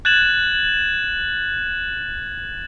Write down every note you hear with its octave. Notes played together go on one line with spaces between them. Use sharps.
F#6 G#6 A6 E7 F#7